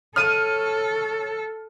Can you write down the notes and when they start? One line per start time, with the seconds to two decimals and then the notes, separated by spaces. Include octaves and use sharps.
0.16 A4 C#5 F6 D#7